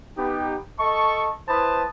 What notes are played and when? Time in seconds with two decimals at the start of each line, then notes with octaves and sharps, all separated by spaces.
0.18 B3 D#4 G4
0.79 A4 D#5 A5 C#6
1.49 E4 B4 C5 A5 B5 D#6